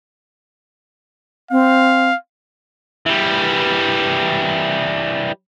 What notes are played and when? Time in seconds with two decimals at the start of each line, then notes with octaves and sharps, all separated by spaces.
1.51 C4 F5
3.06 E3 G3